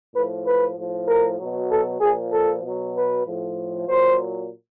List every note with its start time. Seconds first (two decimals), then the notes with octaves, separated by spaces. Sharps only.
0.14 A2 F3 B4
0.46 B4
0.77 A2 F3
1.07 A#4
1.39 B2 F#3
1.70 A4
2.01 A#2 F3 G#4
2.32 A4
2.63 B2 F#3
2.95 B4
3.26 A2 F3
3.88 A#2 F#3 C5